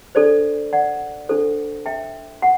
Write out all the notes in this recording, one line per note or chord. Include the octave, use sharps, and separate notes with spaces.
D4 A4 C5 D5
D5 F#5
D4 A4 C5
E5 G5
F#5